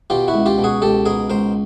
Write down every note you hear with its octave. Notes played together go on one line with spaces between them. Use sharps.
B2 F4 G4
E4 F#4
C#2
F4 G4
B2
F#4 G#4
C#2 G4 A4
B2 G#4 A#4
C#2 A#4 C5